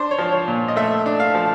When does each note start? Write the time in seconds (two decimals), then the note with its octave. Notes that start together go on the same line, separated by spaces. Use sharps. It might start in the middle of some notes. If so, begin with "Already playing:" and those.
Already playing: D4 C5
0.11 C#5
0.18 F3
0.32 C#5
0.48 A#2
0.68 D#5
0.76 A3 E5
1.06 D4
1.20 F5
1.35 F3